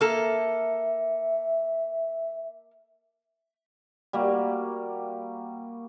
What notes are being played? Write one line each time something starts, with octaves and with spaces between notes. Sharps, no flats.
A#3 A4 E5
G3 A#3 F#4